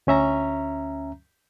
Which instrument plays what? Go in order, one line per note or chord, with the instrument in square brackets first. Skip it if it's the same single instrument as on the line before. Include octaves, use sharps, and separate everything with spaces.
[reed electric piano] D2 C#4 E5 A#5